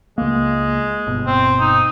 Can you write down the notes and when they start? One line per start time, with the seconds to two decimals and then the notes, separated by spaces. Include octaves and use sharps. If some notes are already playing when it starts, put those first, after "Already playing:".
0.18 C#2 G#3 A#3
1.07 G1 B2
1.27 C4
1.60 D#4